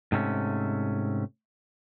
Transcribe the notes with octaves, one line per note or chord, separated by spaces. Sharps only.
G#2 C3 A3 C#4